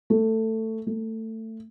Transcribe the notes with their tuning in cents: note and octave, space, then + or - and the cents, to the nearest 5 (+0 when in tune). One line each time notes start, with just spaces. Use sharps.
A3 +15
A3 +20